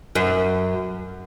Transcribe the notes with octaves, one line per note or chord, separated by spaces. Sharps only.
F#2